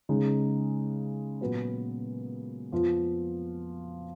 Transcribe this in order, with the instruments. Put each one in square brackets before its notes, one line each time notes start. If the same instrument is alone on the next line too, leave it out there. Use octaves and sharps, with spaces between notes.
[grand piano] C#3 G#3 D#4 G#4
A#2 F#3 B3 F#4 B4
F2 F3 B3 F4